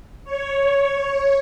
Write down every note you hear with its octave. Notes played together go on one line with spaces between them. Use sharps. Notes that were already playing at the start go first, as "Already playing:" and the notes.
C#5